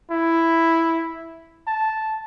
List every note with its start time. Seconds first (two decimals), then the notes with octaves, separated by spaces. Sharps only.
0.11 E4
1.67 A5